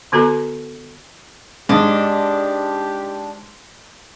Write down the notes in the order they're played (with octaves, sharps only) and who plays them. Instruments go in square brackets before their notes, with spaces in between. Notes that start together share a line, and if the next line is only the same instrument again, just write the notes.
[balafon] D3 B3 F#4 A4 A#4 A#5
[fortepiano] G#2 [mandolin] D4 D#5 [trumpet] G4